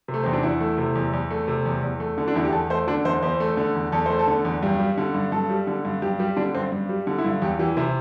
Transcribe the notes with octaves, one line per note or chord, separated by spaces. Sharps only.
C3
A3
E2 C4
D4
E2 E4
A3
C3
E2
E2
A3
C3
E2
E2
A3
D3
D4
E2 E4
G4
E2 A4
A3 C5
D3 D4
E2 C5
E2 C5
A3
D3
E2
E2 A4
A3 C5
A4
D3
E2
G2 G4
G3
D3
G2
G2 A4
G3
D3
G2
G2 G4
G3 G4
D3 D4
G2 C4
G2
G3
D3
E4
G2
E2 G4
E3 G4
C3 E4